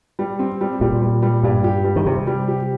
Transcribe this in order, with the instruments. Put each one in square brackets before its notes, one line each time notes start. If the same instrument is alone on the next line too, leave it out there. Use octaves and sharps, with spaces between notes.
[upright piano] G3
C4
G3
[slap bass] A#2 [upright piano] G3
[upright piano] G3
G3
[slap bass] G2 [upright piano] G3
[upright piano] G4
G3
[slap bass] D#3
[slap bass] C3 [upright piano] G3
[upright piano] G3
G4